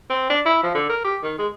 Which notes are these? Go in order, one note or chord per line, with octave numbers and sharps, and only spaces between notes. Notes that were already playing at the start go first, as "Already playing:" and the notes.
C4
D4
E4
F3
D3
A#4
G4
D#3
G#3